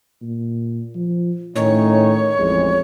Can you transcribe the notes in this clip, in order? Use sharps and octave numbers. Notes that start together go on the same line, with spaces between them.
A#2
F3
A2 D#3 C#4 D#4 C#5
A1 F2 G#3